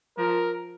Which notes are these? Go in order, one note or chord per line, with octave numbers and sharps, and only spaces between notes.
F3 A#4